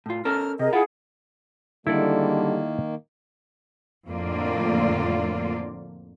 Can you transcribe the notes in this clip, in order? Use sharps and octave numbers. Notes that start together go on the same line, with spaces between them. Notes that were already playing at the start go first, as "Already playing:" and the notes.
A2 F4
C#4 A4 A#4 F6
C3 G#4 A#4 D#5
E4 F4 G#4 F#5
D3 D#3 G3 G#3 A#3 E4 A4 D5
F2 A2 D3 A#3 F4 D5